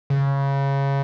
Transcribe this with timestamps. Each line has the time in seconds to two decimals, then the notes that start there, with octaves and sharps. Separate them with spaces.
0.10 C#3